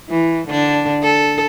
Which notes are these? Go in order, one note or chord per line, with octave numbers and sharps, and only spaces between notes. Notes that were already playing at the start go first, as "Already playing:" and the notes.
E3
D3 D4
A4